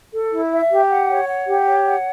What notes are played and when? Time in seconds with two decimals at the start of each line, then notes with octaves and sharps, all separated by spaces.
0.14 A4
0.32 E4
0.52 E5
0.71 G4
0.90 F#5
1.09 C#5
1.28 F#5
1.47 G4
1.67 C#5
1.86 F#5